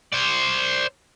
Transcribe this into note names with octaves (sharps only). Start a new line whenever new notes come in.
C5 D5